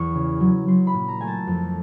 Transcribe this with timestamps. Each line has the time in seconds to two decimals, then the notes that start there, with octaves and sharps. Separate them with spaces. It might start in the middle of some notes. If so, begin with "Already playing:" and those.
Already playing: E2 C#6
0.14 C#3
0.40 F#3
0.68 F#3 C6
0.87 B5
0.94 A#2
1.08 A#5
1.21 A3 G#5
1.27 A5
1.47 F2